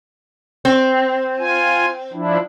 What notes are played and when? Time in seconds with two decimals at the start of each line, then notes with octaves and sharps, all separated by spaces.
0.65 C4
1.39 F4 G#5
2.13 F3 D4 E4